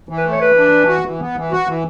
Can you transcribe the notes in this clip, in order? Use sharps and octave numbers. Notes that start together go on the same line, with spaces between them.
E3
B4
A3
C#5
E3 B4
D4
E3
F#4
E3
B3
E3
F#4
E3